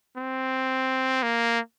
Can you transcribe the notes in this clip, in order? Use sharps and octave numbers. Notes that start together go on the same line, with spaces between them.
C4
A#3